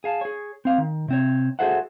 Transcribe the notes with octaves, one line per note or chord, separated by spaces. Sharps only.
G#4 F5 A5
G#4 C#5
C4 F5
D#3
C3 C4 C#5
F#4 G#4 A4 C5 E5 F#5